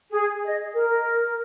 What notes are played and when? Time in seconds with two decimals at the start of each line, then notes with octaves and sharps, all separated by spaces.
0.11 G#4
0.45 D#5
0.74 A#4